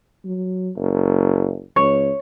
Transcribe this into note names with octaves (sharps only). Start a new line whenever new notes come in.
F#3
F#1
C#2 C#5